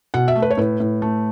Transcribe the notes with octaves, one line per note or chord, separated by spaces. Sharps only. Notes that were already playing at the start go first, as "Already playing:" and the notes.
B2 F#5
E5
A3
B4
C#5
A2 B4
A2
A3